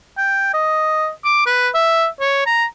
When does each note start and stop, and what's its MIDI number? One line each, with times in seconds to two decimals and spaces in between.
0.18 0.51 79
0.54 1.09 75
1.25 1.41 86
1.46 1.69 71
1.74 2.06 76
2.20 2.46 73
2.47 2.65 82